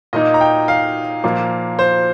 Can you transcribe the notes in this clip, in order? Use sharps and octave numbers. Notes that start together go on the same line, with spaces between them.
A#2 A#3 D#4 D#5
A#5
G5
F5
A#2 F3 A#3
C5